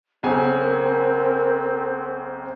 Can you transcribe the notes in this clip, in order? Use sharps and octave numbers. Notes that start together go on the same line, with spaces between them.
B1 C#3 C4 G#5
A#4